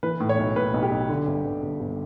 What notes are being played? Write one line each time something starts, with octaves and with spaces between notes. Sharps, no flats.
E3 B4
A2
C#5
B1
A2 B4
B1
G4
B1
D3
G1
G1
G1
G1